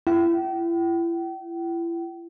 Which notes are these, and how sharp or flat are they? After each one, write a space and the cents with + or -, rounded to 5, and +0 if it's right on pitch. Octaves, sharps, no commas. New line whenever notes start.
E4 +35 G5 -40